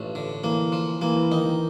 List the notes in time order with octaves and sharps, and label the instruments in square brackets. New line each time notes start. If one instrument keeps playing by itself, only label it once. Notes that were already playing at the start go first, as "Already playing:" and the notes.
Already playing: [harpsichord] A1 G2 [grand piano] F3
[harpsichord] D3
[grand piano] E3 [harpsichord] A#3
[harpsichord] F3
[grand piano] E3 [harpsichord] A#3
[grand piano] E3
[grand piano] D#3 [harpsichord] D#4
[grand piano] D#3